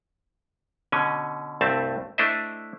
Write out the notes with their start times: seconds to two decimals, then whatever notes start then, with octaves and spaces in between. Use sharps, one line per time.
0.92 B2 D3 C#4 G#5
1.61 C2 G2 A3 C4 E5 A5
2.18 A3 D4 E4 C5 D#5 E5